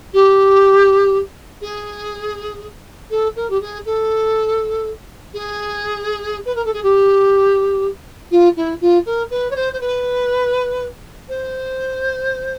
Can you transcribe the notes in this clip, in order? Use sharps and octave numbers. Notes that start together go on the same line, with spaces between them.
G4
G#4
A4
A#4
G4
G#4
A4
G#4
B4
A#4
A4
G#4
G4
F4
E4
F4
A#4
B4
C#5
C5
C5
B4
C5